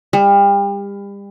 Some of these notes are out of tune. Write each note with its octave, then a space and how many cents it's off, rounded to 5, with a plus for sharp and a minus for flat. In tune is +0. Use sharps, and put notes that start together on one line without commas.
G3 +35